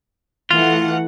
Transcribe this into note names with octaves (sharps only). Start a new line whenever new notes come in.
E3 A3 F4 F#5